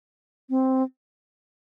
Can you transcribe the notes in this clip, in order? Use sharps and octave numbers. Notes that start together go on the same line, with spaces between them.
C4